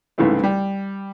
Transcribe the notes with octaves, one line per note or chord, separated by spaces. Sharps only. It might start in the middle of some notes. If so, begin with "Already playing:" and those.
C2 G#2 C#3 E3 A3 B3
G3